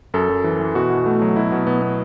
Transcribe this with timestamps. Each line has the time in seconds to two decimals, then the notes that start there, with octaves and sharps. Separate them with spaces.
0.14 F#2 A4
0.29 F#2
0.44 E3
0.60 E3
0.75 B2 F#4
0.90 B2
1.06 A3
1.22 F#3
1.36 B2 E4
1.52 B2
1.67 B3
1.82 B3